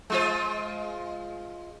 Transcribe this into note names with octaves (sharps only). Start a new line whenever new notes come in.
G#3 F4 C5